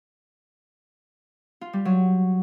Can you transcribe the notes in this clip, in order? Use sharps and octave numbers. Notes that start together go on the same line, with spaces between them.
F4
G3
F#3